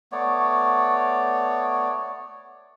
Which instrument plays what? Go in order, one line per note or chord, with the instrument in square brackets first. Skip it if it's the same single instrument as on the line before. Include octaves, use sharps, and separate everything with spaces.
[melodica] A3 B3 C#5 D5